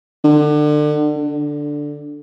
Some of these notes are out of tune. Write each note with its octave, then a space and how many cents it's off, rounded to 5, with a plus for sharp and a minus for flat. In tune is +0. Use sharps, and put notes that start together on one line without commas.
D3 +30
D3 +0